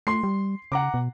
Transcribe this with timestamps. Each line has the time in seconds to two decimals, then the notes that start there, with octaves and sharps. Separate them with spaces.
0.07 A3 C6 C7
0.23 G3
0.72 C#3 F#5 A#5 D6
0.94 B2